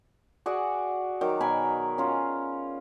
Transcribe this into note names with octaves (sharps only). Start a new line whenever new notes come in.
F#4 G#4 D5 F#5
D#3 F#3 D6
B2 A#4 G#5 B5
C#4 F4